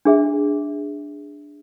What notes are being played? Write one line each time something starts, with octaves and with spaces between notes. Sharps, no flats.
D4 G#4 E5